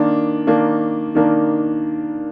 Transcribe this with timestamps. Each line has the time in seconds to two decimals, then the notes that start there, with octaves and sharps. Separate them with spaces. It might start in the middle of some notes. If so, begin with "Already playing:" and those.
Already playing: D#3 A#3 D4
0.47 D#3 A#3 D4
1.15 D#3 A#3 D4